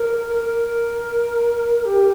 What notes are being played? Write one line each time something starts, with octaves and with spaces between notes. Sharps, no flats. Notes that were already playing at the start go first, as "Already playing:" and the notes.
Already playing: A#4
A#4
G4